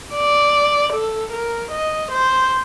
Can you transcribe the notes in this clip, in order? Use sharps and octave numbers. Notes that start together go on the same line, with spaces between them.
D5
A4
A#4
D#5
C5